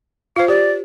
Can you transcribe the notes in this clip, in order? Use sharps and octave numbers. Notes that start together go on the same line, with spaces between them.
F4 C5 F5
G4 D5